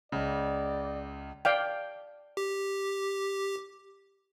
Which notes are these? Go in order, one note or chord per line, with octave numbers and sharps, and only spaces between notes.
C#2 C#3 D5
D5 F5 G5
G4